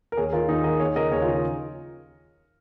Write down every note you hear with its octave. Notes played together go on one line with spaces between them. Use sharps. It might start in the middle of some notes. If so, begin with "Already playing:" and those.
A#4
D#2 G#4 C#5
D#3 F4 A#4
D#2 D#4 G#4
D#3 A#4 D#5
D#2 G#4 C#5
C#3 F3 A#4 D#5
D#2 G#4 C#5
F4
C#3 F3 D#4 G#4